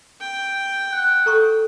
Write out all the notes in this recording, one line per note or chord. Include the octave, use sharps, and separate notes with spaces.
G5
F#5
A4 A#5 C#6